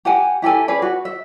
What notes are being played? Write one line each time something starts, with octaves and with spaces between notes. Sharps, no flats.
G4 F#5 G#5
E4 G4 A4 G#5
C#4 G#4 B4 D5
F#4
E5